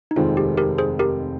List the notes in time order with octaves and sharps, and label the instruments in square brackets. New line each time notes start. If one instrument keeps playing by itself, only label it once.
[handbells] D#4
[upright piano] F1 D#2 D#3 G#3 C4 [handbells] F4
[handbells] G4
G4 A#4
G#4 C5
G4 A#4